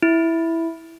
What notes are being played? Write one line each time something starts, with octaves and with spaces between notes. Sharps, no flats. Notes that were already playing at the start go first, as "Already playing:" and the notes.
E4